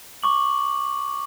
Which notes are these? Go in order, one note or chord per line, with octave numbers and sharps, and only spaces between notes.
C#6 D6 F#7